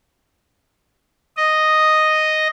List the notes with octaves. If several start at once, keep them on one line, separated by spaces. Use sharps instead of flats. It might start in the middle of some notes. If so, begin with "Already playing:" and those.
D#5